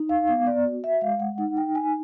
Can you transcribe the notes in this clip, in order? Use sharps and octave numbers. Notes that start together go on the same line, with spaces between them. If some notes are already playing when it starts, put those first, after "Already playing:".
Already playing: D#4
F5
B3 F5
D5
F#4
E5
G#3 F5
F#5
D#4 F#5
G5
D#4 G#5